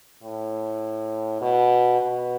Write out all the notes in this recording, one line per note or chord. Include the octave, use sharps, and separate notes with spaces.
A2
B2
B2